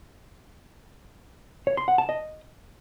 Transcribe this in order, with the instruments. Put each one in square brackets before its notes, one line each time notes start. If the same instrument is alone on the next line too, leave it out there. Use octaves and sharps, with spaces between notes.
[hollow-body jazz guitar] C#5
C6
F#5
A5
D#5